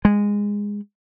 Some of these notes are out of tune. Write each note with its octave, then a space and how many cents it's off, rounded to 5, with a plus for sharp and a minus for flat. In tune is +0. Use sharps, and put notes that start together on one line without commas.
G#3 -15